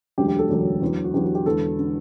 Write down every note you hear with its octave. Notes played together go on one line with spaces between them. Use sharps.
E1 D2 D3 F#3 G4
G4
A4
E1 D2 D3 F#3 G4
E2 D3 F#3
F#4
E2 D3 F#3 G4
F#4
G4
E1 E2 D3 A4
D3